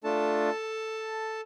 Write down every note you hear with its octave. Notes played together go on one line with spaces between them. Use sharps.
A3 D4 F4 A4 A5